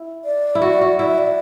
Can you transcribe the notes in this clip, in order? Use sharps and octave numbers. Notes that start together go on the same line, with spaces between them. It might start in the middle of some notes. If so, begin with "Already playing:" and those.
Already playing: E4
D5
E4
F#4
F#4
E4 D5
E5
D5